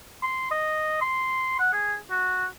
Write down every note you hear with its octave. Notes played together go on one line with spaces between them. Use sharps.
C6
D#5
C6
F#5
G#4
F#4